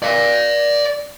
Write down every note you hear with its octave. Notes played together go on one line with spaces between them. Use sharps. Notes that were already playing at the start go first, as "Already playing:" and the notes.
D5 F5